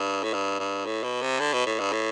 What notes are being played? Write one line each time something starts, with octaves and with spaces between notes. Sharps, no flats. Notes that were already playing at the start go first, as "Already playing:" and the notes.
Already playing: G2
A2
G2
G2
A2
B2
C3
D3
B2
A2
G2
A2